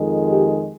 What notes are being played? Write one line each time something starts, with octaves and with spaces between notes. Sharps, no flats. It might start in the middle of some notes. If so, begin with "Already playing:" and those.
Already playing: F2 D#3 G#3
G4